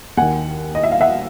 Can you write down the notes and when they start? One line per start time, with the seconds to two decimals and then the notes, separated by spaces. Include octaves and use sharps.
0.17 D#2 D#3 F#5 G#5
0.75 D#5
0.83 E5
0.92 F5
1.01 E5 F#5